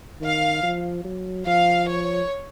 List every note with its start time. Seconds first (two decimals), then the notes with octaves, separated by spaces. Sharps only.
0.21 D#3 F5
0.63 F3
1.05 F#3
1.47 F3 F5
1.89 C#5